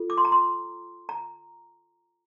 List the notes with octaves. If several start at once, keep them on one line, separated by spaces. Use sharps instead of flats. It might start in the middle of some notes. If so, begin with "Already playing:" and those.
Already playing: F4 A4
D6
C6
A#5
C6
A#5